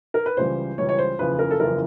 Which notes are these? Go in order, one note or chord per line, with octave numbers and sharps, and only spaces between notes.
A#4
B4
C#2 C#3 E3 G3 C5
C#2 C#3 E3 G3 C#5
C#5
C5
F#1 E2 C#3 F3 B4
A#4
A4
F#1 E2 C#3 F3 A#4